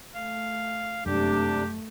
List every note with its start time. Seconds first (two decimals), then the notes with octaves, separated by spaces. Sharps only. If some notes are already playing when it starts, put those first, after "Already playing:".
0.15 A3 F5
1.06 F1 F#2 C3 G#3 A3 D4 G4